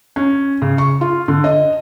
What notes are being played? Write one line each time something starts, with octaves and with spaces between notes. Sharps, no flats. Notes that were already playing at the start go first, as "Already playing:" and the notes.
C#4
C#3
C#6
F4
D3
D#5